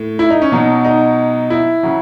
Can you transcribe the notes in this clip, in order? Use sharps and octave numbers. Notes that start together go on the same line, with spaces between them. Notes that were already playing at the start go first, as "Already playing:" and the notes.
Already playing: A2
E4
D#4
C#4
B2 F#3 D#4
D#4
E4
C#3 F#3